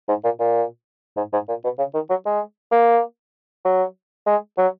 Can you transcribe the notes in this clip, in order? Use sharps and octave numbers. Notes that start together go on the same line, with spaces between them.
G#2
A#2
A#2
G#2
G#2
A#2
B2
C#3
D#3
F#3
G#3
A#3
F#3
G#3
F#3